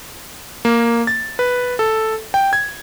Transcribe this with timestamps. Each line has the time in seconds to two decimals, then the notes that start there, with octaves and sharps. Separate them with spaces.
0.65 A#3
1.07 A6
1.39 B4
1.79 A4
2.34 G5
2.53 G#6